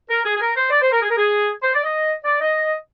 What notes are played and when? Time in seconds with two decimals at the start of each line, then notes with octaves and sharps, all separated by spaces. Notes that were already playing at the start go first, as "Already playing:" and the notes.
0.09 A#4
0.25 G#4
0.36 G#4
0.40 A#4
0.56 C5
0.71 D5
0.81 C5
0.91 A#4
1.02 G#4
1.10 A#4
1.16 G#4
1.63 C5
1.74 D5
1.84 D#5
2.24 D5
2.41 D#5